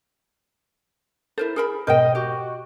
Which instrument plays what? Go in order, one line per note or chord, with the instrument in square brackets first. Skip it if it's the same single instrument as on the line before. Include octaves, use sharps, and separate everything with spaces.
[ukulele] E4 A#4 C5 [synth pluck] A4
[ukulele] G#4 A#4 B5
[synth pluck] G#2 B2 G6 [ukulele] A#4 C5 G5 [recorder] D#5
[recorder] F#4 [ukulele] G4